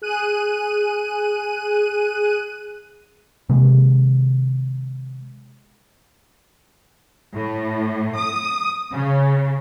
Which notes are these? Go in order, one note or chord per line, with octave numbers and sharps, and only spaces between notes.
G#4 F#6 D#7
C3 D#3 G#3
A2
D#6
C#3